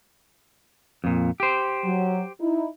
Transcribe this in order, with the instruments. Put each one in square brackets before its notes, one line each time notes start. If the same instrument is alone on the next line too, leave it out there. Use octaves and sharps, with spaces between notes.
[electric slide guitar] F2 A#2
G4 C5
[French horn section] F#3
D#4 E4